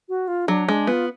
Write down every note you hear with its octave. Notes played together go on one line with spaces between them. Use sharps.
F#4
F4
F#3 D4
G#3 D4
B3 F4